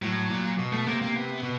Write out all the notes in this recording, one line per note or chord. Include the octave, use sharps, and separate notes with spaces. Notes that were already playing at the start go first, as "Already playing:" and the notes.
A2 F#3
A#2
B2
A3
C3 A#3
A#3
B3
B2